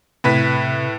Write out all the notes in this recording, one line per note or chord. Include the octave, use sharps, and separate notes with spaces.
A2 C3 B4 B6